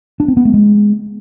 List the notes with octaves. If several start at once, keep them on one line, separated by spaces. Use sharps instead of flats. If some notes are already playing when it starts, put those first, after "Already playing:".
D4
C4
B3
A3
G#3